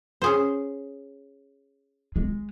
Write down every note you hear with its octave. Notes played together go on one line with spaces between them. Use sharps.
C#4 G#4 C5
G#3